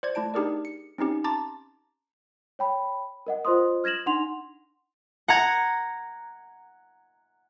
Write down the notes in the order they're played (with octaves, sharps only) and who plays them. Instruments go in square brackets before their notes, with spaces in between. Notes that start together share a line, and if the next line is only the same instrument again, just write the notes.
[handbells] C5 D5 G#6
A3 E4 A5 D7
D4 D#4 G4 G#4 A#4 D5
C#7
C4 C#4 D#4 G4
A5 A#5 C6 D6 A6
[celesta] C#5 G5 B5
A#4 D#5 F#5
F4 C5 D#5 C6 D#6
F6 G#6 A#6 E7 F#7
D4 D#4 F#5 C6 F7
[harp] F#5 A#5 G#6